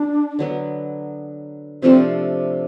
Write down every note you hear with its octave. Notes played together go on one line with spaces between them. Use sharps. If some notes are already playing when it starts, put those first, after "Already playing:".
Already playing: D4
D3 F#3 B3
C3 F3 A3 C4 D4